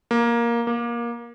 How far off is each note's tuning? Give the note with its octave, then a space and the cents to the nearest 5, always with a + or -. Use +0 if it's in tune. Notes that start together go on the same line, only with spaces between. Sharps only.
A#3 +10
A#3 +20